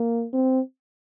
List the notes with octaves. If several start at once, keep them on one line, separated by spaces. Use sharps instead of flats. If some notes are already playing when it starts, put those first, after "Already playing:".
Already playing: A#3
C4